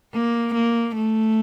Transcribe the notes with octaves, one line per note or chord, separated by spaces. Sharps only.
A#3
A#3
A3